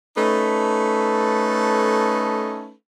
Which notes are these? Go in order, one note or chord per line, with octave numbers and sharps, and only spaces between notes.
A3 C#4 D#4 A4 B4